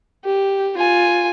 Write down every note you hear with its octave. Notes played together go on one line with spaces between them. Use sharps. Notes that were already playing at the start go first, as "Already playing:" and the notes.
G4
F4 G#5